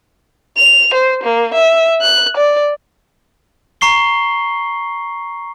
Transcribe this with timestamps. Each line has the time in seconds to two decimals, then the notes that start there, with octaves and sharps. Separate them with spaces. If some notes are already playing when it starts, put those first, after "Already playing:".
0.57 F7
0.94 C5
1.23 A#3
1.54 E5
2.01 F#6
2.37 D5
3.81 A#5 C#6 C7 G7